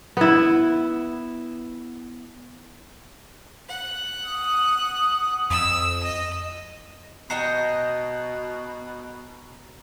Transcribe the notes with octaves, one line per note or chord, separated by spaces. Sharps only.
B3 E4
F#5
D#6
F2 E6
D#5
B2 F#4 D#5 G5 A#5 C7